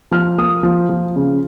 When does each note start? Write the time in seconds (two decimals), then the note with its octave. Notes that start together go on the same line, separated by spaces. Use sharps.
0.11 F3 F6
0.38 A#3 D#6
0.63 F3
0.89 F3
1.16 C#3